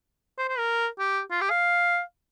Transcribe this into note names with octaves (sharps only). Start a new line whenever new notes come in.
C5
C5
A#4
G4
F4
G4
F5